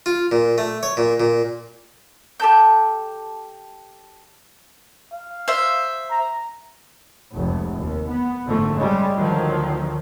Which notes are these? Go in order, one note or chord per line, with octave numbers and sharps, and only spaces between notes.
F4
A#2
A3
C#5
A#2
A#2
G4 A4 A5 G6
F5
C5 E5
A#5
F1 C#2
D#2
B3
F#1 G#2 D3 F3 A3
C#3 G3 G#3
D2 D3 D#3 F3 F#3